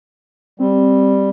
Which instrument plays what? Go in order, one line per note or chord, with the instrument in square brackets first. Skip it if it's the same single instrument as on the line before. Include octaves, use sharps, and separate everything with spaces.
[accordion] G3 [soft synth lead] C4